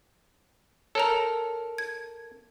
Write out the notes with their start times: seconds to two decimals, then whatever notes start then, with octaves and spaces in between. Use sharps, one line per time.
0.95 A4 A#4 C#5 A#5
1.78 G#6